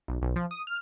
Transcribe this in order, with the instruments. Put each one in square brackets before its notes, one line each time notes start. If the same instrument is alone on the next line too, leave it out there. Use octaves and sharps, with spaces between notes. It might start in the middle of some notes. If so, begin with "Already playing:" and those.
[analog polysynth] B1
B1
F3
D#6
F6